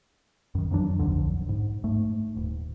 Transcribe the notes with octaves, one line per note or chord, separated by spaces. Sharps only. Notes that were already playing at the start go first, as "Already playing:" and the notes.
F#2 D#3
F2 E3 F#3 D4
D#1 B1 F2 D3
G#2
G#2 A3
D#1